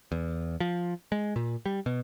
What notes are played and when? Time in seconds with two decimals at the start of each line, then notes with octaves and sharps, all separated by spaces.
0.12 E2
0.60 F3
1.12 G#3
1.36 A#2
1.66 G3
1.86 B2